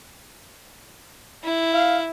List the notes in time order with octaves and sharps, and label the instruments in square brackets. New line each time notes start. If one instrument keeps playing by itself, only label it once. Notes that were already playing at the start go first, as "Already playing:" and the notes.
[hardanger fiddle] E4
[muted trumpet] F5